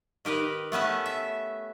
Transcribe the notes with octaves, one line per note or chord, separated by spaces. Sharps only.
D#3 G4 A#4 B4
A3 B3 C#4 A5
E5